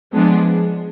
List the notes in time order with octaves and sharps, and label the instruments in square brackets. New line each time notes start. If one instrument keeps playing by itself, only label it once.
[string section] F3 G#3 B3 D4